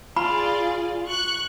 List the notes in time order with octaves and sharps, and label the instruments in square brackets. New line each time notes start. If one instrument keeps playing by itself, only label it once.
[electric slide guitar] F4 [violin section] G#4 D5 [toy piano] B5
[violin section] C#6 F#6